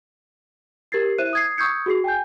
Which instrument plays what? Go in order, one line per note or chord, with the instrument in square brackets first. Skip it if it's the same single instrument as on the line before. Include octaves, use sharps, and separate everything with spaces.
[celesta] G4 A#4 G#6 A6 C7
E4 C5 E5 F#6 D#7 E7
D#6 G#6 C7
C#6 D#6 E6 G6 G#6 C#7
F#4 G#4 C7
G5 G#5 G6